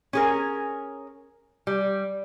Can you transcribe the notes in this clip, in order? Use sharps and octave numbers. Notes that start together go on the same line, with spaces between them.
C#4 G#4 A#4
G3